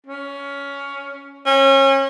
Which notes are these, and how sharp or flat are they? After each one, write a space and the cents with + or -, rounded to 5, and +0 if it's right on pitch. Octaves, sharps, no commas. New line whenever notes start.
C#4 +15
C#4 -30